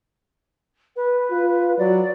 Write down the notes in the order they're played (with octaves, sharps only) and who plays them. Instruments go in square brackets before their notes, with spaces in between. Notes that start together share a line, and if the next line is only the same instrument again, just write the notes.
[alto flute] B4
[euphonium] F4
[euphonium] F#3 [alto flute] D5